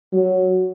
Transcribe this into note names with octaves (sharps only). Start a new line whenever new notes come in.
F#3